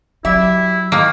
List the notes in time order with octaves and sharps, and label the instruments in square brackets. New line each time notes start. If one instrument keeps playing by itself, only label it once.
[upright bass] F#3 [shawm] E4 [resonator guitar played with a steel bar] G4 E5
[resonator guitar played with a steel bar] D#3 E3 [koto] A#3